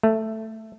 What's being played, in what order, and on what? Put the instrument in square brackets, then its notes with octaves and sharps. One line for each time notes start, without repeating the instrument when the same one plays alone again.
[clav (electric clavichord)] A3